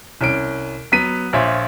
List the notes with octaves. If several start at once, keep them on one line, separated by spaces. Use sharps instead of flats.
C2 C#4 D7
F#3 B3 B6 D#7
A#1 F4 C5 C#5 E5